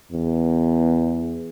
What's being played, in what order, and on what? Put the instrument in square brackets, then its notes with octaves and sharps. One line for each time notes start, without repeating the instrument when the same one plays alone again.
[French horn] E2